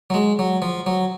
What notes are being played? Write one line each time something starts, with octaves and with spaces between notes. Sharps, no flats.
F#3
G#3
F#3
F3
F#3